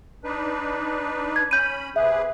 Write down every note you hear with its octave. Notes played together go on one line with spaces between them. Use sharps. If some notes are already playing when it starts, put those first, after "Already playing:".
D4 D#4 B4
G#6
C#4 B5 G6 D#7
C3 G#4 B4 E5